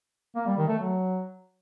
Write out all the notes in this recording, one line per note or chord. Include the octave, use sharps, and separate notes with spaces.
A#3
G3
D#3
A3
F#3